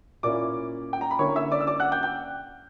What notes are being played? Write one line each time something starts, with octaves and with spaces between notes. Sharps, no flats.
A#2 A#3 C#4 E4 D5 D6
G5
A#5
B5
D3 A#3 C#4 E4 C#5 C#6
E5 E6
D5 D6
E6
D5 D6
F#5 F#6
G5 G6
G5 G6